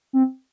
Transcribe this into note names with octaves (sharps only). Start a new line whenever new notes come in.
C4